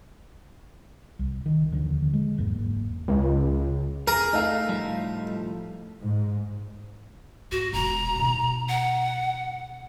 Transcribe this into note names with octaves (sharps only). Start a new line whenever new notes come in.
C2
D#3
D#1 D#2 D3 F3
G#3
F#1 E2 G#2 A#3
C#2
G#4 A#4
A3 D#4 A4 F5
A2 F3 G3
G#2
G#2 F#4
E1 A#1 A#5
B2 D#4
F#5